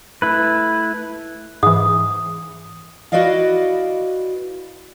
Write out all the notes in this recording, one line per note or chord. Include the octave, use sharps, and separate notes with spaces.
A3 E4 B4
G#2 E3 D#6
E4 F#4 B4 D5 D#5 F5